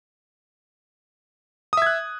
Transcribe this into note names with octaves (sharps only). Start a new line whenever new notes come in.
E5 D#6 F#6 G#6